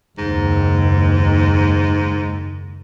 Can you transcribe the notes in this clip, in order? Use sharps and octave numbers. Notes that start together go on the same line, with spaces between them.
F#1 D#2 G#2